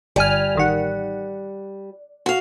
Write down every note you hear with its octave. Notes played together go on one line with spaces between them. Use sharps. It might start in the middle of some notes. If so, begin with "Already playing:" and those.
G1 G3 G#5 F6
A1 D#3 F#5
F#4 F5